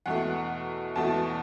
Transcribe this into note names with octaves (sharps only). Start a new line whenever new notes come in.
E2 B2 A3 F#5
E2 B2 A3 A5